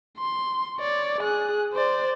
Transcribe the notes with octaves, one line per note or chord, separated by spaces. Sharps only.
C6
C#5 D5
G#4 F#6
C5 D5